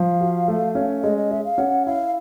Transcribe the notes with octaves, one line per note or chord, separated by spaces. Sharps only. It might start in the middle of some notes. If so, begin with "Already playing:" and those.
Already playing: F3 F5
F#4
A3
C#4
G#3 D#5
D#5
G#4 E5
F5
C#4 F#5
E4 F5